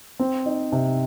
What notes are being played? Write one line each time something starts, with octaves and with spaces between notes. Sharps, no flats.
C4
D#4
C3